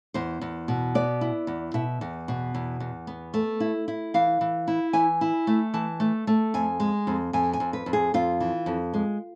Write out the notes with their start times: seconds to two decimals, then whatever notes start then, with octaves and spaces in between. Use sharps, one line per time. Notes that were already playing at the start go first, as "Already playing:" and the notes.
0.14 E2 C5
0.41 E2
0.68 B2
0.95 B3 D5
1.21 E4
1.47 E2
1.74 B2 E5
2.01 E2
2.28 B2
2.54 E2
2.80 E2
3.07 B3
3.34 A3
3.60 E4
3.88 E4
4.14 E3 F5
4.41 E3
4.68 E4
4.93 E3 G#5
5.21 E4
5.47 A3
5.74 E3 A5
6.00 A3
6.27 A3
6.54 F2 G#5
6.80 G#3
7.07 F2
7.33 F2 G#5
7.53 G#5
7.60 F2
7.73 B4
7.86 F2
7.93 G#4
8.14 F2 F4
8.40 E3
8.66 F2
8.94 G#3